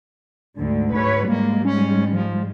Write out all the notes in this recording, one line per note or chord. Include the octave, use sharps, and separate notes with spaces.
D2 G#2 D3
G#2 B4 C#5
G#2 G3 G#3 A#3
C#4
F3